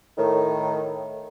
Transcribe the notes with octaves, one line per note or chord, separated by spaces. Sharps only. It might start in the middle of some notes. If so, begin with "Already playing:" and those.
A2 D#3